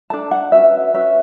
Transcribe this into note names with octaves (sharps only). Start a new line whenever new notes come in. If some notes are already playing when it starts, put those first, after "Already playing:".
D4 A4 A5
F#5
C#4 F#4 B4 E5
C#4 F#4 B4 E5